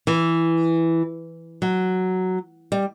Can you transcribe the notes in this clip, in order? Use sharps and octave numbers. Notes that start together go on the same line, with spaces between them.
E3
F#3
G3